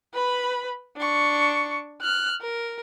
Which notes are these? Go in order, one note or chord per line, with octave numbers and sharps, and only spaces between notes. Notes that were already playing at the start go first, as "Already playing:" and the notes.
B4 B5
D4 C#6
F6 F#6
A#4